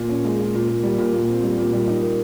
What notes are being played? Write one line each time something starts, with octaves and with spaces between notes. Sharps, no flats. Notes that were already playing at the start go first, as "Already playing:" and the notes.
Already playing: A#2
C#4
G#3
F4
A#2
A#3
G3
A#2
A#2
C4
G3
A#2
G3
D#4
A#3